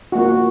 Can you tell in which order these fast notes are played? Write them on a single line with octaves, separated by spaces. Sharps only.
F#4 A#3 F4